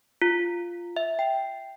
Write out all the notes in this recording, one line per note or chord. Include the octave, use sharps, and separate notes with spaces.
F4
E5
G5